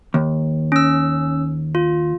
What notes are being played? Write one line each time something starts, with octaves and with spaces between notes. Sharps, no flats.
D#2
C#4 E6
F4